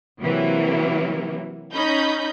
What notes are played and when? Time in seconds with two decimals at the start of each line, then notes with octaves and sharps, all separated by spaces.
0.20 C3 E3 F#3 A#3
1.73 C#4 D#4 D#5 B5 G6